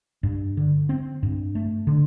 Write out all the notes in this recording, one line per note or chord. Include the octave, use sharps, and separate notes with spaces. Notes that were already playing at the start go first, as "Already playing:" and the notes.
G2
D3
C4
G2
A3
D3